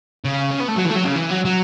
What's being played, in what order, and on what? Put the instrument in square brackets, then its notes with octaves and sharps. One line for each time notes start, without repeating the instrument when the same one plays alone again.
[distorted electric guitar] C#3
C#4
B3
A3
F#3
E3
A3
F#3
C#3
E3
F#3
F#3